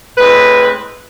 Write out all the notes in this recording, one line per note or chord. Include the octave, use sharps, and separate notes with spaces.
A2 G#3 C4 B4